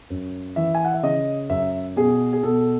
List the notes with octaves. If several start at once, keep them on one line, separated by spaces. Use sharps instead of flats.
F#2
E3 E5
G#5
F#5
E5
C#3 D#5
F#2 E5
B2 G#4
G#4
B2 A4